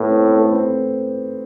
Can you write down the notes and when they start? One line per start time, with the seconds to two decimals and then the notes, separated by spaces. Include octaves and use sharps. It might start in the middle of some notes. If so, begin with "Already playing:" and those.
Already playing: A2 A3 B3
0.09 C4
0.24 B3
0.38 A3
0.53 C4